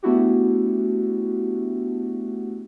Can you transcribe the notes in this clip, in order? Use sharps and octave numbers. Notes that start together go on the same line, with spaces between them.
A3 B3 D4 E4 F#4 G4